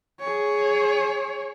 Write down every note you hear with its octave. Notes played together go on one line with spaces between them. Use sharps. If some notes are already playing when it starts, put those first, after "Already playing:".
G#4 C#5